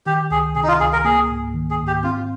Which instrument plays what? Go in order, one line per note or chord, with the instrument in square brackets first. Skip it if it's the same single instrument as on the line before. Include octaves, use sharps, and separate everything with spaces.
[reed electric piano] D#3 [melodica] G4
[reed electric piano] C#2 [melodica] G#4
[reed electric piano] C3 [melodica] G#4
[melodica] D#4
F4
[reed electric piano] C#2 [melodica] G#4
[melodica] A#4
[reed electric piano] A#3 [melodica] G#4
[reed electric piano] G#2
D#3
[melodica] G#4
[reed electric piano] G#2
[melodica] G4
[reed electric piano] C4 [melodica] F4